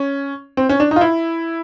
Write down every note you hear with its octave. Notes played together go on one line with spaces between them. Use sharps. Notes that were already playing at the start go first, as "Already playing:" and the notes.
Already playing: C#4
C4
C#4
D4
D#4
F4
E4